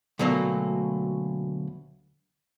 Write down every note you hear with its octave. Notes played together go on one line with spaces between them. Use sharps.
D2 B2 F#3 A3 A#3